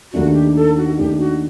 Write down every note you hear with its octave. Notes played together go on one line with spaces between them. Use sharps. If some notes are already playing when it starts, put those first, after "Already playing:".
D#2 D#3 A3 D4 F#4
G4
A4
F#4
D#2 D#3 A3 D4 G4
F#4